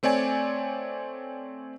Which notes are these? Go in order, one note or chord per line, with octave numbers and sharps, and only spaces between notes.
A3 C4 C#5 D5 G#5